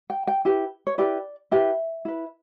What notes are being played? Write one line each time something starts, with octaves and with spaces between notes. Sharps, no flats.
G5
G5
E4 G4 B4
C#5
E4 G4 B4 D5
E4 G4 B4 E5
E4 B4